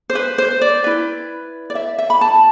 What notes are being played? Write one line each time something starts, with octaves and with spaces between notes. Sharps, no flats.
C5
B4
C5
D5
E4 B4
D5
E5
E5
B5
A5